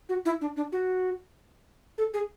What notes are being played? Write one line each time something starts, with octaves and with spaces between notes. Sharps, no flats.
F#4
E4
D4
D4
F#4
A4
G#4